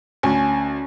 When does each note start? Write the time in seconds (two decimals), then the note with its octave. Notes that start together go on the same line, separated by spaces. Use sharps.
0.23 D2 C#4